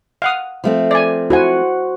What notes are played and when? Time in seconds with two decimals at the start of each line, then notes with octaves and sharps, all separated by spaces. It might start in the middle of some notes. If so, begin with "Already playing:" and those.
0.22 F5 F#5 D#6
0.64 F3 A3 C4
0.91 D5 G#5
1.30 E4 F#4 C5 F#5 G#5